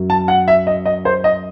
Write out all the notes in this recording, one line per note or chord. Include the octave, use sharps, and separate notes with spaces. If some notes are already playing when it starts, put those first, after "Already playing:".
Already playing: F#2 F#3
A5
F#5
E5
D#5
D#5
C5
D#5